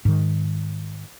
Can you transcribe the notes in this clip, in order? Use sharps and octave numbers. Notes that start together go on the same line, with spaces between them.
G#2 D#3